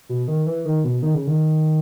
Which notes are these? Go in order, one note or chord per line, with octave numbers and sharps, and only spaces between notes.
B2
D#3
E3
D#3
B2
D#3
C#3
D#3